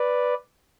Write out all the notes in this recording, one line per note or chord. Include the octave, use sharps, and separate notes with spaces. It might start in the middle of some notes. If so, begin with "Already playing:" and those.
Already playing: B4 D5